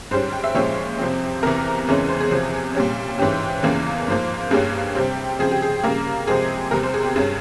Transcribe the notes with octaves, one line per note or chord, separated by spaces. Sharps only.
G#2 G3 C#4 C5
G5
E5
A#2 F3 G#3 C#4 C#5
F2 C3 F3 C4
E2 C3 E3 A#4
E2 C#3 E3 G#3 C#4
C5
G#4
E2 C3 F3
A#2 G3 C#4
G#2 E3 G#3 C#4 G4
E2 C#3 E3 A#3 C#4
G#2 F3 A#3
G2 G3 A#3 C#4 G#4
C3 G3 C4 G4
C#3 F3 C4 G#4
G4
G#4
C#3 G3 A#3 A#4
C3 F3 G#3 C4 G#4
E2 C3 G3 A#4
C5
G#4
G4
G2 G3 C#4 G#4